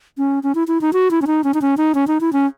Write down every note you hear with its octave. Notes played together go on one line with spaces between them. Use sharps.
C#4
C#4
E4
E4
D#4
F#4
E4
C#4
D#4
C#4
D#4
C#4
D#4
C#4
D#4
E4
C#4